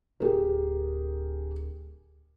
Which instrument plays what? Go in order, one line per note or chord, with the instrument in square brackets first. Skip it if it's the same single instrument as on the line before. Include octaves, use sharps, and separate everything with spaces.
[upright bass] D1 D2 [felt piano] G4 G#4 A#4